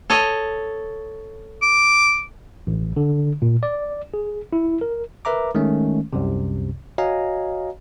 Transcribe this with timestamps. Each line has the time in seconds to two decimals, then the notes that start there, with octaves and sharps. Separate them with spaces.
0.10 A4 C#5 D#5
1.62 D6
2.67 A1
2.96 D3
3.42 A#2
3.63 D5
4.14 G#4
4.53 E4
4.81 A#4
5.25 A#4 B4 E5 A#5 D6
5.55 D#3 G#3 A3 C#4
6.13 C2 F#2 C3
6.98 F#4 C#5 D#5 F5 G#5 A#5